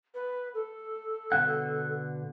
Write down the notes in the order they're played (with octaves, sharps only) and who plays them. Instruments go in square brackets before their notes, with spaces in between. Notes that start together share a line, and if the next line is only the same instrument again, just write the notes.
[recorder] B4
A4
[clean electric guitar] B2 D3 F#5